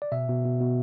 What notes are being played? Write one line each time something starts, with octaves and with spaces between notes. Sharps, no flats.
D5
B2 E5
B2
B2
B2